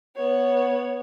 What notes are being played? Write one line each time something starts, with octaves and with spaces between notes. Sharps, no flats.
B3 C#5